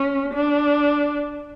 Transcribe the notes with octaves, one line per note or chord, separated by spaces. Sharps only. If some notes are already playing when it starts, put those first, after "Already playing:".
Already playing: C#4
D4